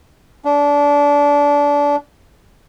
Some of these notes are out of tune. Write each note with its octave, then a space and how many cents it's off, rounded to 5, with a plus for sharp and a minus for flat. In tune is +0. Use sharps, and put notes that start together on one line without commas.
D4 -25